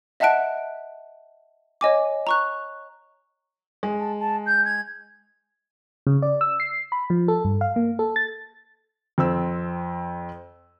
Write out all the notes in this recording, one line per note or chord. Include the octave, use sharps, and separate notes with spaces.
D#5 E5 F#5 A5 F#6 D7
C#5 D#5 G#5 D6
A#5 C#6 F#6
G#3
A5
A5
G6
G#6
C#3
D5
E6
C7
B5
F3
A4
G2
F5
A#3
A4
A6
F2 C4 E6